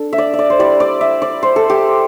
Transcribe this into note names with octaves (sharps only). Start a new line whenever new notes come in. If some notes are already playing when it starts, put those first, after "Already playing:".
Already playing: D4 A4
E5
D5
E5
D5
C5
G3 E4 D5
D5
E5
D5
C5
A4
G4